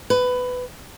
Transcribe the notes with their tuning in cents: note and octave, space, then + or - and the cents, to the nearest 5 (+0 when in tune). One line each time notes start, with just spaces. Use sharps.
B4 +15